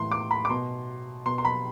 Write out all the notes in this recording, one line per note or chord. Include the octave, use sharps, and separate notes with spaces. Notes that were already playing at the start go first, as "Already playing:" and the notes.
Already playing: A2 E3 C6
D6
B5
D6
B2 C6
B2 C6
C6
B5